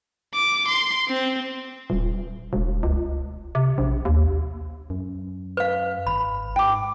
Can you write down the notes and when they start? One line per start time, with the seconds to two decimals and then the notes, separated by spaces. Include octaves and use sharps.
0.35 D6
0.67 C6
1.09 C4
1.90 D#1
2.53 E1
2.83 C#2
3.55 C3
3.78 A#1
4.05 D#2
4.90 F#2
5.57 B4 F5
6.07 G#1 B5
6.56 G#2 G5 D6